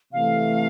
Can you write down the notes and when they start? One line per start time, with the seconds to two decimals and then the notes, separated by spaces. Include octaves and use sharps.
0.12 C3 E3 A3 F5